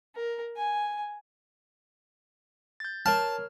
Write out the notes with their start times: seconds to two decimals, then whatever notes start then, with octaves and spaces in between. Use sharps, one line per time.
0.15 A#4
0.57 G#5
2.80 G6 A6
3.06 A#4 C#5 A5 F6